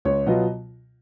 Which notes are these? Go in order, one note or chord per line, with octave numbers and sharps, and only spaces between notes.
C#2 C#5
B2 F#3 B3 F4 D#5